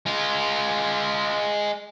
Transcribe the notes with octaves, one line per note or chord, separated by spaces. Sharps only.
G#3 F4